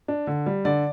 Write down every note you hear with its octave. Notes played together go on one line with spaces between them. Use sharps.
D4
D3
G3
D3 D5